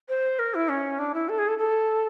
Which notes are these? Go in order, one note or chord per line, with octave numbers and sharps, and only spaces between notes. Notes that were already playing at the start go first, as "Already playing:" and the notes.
C5
A#4
E4
C#4
D4
E4
A4
G#4
A4
A4